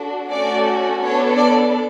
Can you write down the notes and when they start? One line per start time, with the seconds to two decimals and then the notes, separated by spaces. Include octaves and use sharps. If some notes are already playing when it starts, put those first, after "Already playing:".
Already playing: D4 F#4 A4
0.29 A3 C#4 F#4 A4 D5
1.01 B3 D4 A4 C#5
1.37 D5